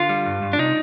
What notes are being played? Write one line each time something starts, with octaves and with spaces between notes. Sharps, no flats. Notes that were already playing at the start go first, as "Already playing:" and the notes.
Already playing: D3 F4
G3
G2
G2
D4
C3 D#4